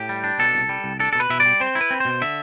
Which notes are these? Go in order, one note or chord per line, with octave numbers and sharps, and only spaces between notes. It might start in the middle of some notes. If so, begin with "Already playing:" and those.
Already playing: A2 G4
G3
D4
B2 A4
C2
G3
C2
D4 A4
A4
B2 B4
B2 E5
G3 D5
C4 C5
E4
B4
C4
B2 C5
D3 E5